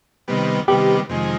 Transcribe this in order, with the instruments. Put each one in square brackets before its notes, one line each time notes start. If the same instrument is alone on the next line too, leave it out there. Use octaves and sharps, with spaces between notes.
[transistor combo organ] C3 D#3 G3 B3
[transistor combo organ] C3 D#3 G3 B3 [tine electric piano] G4
[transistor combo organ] F2 C3 D#3 G#3